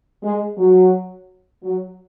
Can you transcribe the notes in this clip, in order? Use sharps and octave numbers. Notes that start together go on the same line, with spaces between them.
G#3
F#3
F#3